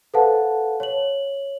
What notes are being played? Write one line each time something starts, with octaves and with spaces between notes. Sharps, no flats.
A4 B4 C5 F5 F#5 A5
C#5 F#7